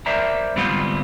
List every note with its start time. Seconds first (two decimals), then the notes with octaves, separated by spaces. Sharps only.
0.06 A#4 C5 D5 E5 A#5
0.56 G#2 D3 G3 B3 C4 F4